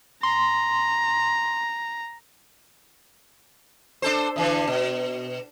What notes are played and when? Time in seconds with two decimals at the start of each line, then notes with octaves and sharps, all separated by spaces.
0.23 A#5 C6
4.02 D4 A4 C5
4.36 D3 E3 D4
4.67 B2